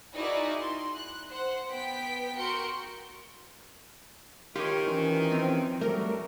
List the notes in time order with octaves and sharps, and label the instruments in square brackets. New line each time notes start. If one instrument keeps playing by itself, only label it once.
[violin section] D#4 E4 F#4 G#4 A#4 D5
C6
F#6
C5 F#5
B3 G5 B6 D7
F#4 A#4 C6 G6 C#7
[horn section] D#3 [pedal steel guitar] F4 C#5 [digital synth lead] G4
[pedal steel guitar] E3 F3 C#4
[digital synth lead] C4
[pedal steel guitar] F#3 G3 A3 [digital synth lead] A#4